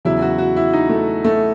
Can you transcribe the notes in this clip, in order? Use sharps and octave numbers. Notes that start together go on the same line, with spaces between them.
E2 C#3 F#3 E4
F#4
F#4
E4
D#4
A3
A3